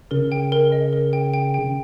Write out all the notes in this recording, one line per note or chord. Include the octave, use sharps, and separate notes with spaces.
C#3 A#4
G5
A#4
D#5
A#4
G5
G5
G5